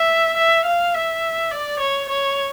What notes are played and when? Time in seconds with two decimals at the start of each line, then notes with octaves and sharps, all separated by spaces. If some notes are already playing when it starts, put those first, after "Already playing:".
Already playing: E5
0.37 E5
0.65 F5
0.94 E5
1.51 D5
1.80 C#5
2.09 C#5